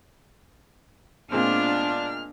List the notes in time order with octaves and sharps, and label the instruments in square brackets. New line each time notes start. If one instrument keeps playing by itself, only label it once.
[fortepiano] A#2 G#3 C4 [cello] B3 F4 [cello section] D4 [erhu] F6